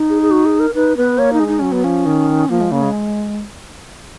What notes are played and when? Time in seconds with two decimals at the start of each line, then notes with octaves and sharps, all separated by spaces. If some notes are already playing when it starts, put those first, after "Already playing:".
Already playing: D#4
0.09 G#4
0.22 G#4
0.31 F#4
0.45 G#4
0.60 A#4
0.74 D#4 B4
0.97 B3 B4
1.18 A#3 C#5
1.33 D#4
1.40 G#3
1.48 D#4
1.59 F#3 C#4
1.72 B3
1.84 F3 C#4
2.06 D#3
2.49 F3 A#3
2.61 G#3
2.71 C#3 A#3
2.83 G#3